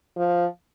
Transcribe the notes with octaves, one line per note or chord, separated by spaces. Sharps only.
F3